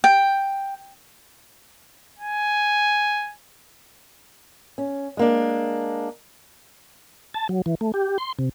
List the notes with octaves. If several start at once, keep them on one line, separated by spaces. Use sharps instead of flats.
G5
G#5
C#4
G#3 A#3 D4
A5
F#3
E3
A3
G4
C6
C3